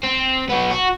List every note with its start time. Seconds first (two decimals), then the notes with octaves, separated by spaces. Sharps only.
0.03 C4
0.49 F#3 B3
0.71 F#4